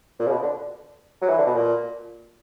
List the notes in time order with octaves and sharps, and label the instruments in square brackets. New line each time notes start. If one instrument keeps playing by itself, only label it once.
[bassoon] A#2
C#3
B2
D3
F#3
E3
D3
B2
A#2